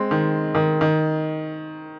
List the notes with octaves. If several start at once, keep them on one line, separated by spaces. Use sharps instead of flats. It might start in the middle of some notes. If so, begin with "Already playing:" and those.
Already playing: G#3 C4
D#3
D#3
D#3